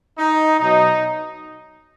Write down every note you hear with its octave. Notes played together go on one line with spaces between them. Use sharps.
D#4
B2 F#3 D#4